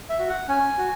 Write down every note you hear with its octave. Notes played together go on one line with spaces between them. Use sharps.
E5
F#4
F#5
C#4 G#5
F#4